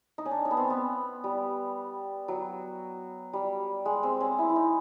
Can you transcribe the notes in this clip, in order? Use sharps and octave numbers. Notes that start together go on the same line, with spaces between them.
D#4
C#4
D4
C#4
B3
C4
B3
G3
F#3
G3
G#3
C4
C#4
E4
E4
D#4